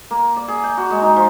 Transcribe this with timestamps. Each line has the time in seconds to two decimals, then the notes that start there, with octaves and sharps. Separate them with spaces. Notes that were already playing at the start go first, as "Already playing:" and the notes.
0.11 A#3
0.36 D5
0.48 G#4
0.63 G5
0.77 F#4
0.90 G#3
1.02 D#4
1.16 F3